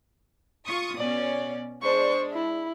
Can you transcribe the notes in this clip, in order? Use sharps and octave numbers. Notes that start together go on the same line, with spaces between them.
F4 C#6 D#6
B2 C#4 D5
G#3 D4 C5 C#6
E4